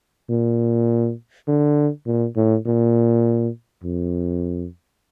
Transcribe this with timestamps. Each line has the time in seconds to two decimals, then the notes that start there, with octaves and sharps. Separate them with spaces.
0.30 A#2
1.48 D3
2.06 A#2
2.36 A2
2.66 A#2
3.84 F2